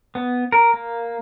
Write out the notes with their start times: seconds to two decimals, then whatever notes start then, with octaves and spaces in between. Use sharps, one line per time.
0.15 B3
0.52 A#4
0.74 A#3